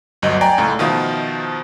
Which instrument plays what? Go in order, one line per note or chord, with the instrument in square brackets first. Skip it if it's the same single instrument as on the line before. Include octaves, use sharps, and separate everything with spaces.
[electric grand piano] G1 D2 F#3 D#5
D5 G5 G#5 A#5
C#2 A2 A3 A#5
B2 D#3 F3 F4 E5